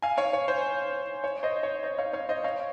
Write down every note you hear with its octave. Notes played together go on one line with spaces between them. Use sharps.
F5 G#5
C#5 F5
C#5
C5
C#5
C5 D#5
C#5
C5 D#5
C#5 F5
C#5 F5
C5 D#5
C#5 F5